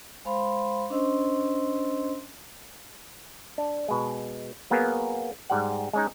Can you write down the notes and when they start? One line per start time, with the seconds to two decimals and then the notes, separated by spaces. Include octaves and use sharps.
0.25 G#3 C5 F5 B5 C6
0.90 C#4 D4 C5 D#5 C6 E6
3.58 D4
3.88 B2 G#3
4.70 F#3 A#3 B3 G#4
5.50 G#2 G3 F#5
5.93 G#3 C#4 D#4